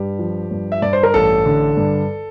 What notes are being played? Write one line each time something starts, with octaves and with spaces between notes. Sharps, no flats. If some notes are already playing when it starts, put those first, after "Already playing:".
Already playing: G2 G4
F3
G2
E5
G2 D5
C5
A#4
A1 A4
D3
G2